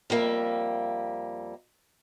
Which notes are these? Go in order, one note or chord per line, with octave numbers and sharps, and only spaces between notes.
F2 G3 A#3 E5